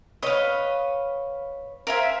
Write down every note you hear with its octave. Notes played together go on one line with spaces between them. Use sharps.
B4 C#5 D#5 F5
A#4 C5 E5 F5 G#5